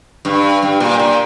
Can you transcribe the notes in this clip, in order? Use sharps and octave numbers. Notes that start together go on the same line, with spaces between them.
G2
G2
A#2
A#2